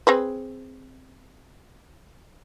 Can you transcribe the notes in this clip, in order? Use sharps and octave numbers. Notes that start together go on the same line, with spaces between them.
C4 G#4 B4